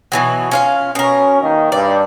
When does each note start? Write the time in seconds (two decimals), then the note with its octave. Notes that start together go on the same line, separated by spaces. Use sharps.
0.12 B2 E3 F#3
0.51 C#4 F4 F5
0.95 B2 C#4 A#4
1.42 D#3 A#3 D#4
1.72 G2 D5